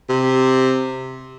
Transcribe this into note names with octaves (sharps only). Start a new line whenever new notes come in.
C3